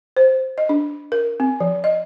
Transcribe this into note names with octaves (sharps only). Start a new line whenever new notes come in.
C5
D#5
D4
A#4
C4
F3
D#5